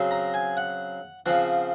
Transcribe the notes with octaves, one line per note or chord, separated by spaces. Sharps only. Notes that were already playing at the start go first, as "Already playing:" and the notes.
Already playing: C#3 F#3 C4
A#5
G#5
F#5
C#3 F3 C4 F#5